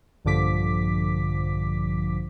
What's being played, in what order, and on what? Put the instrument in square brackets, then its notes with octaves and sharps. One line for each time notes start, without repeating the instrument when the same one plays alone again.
[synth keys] A#1 G2 D3 F3 D6 B6